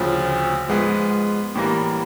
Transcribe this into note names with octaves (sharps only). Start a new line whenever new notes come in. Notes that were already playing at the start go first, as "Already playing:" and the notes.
Already playing: D2 C#3 F3
G#2 F3 G#3 B3
A2 E3 G3 A#3